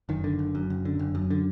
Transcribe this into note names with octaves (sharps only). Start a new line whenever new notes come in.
F#1 D#3
D3
F#1
F#2
F#1
D3
F#1
F#2
D3